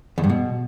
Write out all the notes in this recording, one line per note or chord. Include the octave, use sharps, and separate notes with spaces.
E2
G2
B2